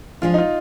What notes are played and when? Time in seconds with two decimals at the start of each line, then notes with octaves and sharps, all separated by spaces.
0.22 F3 G#3 D4 F4 G#4
0.34 D#4
0.38 F4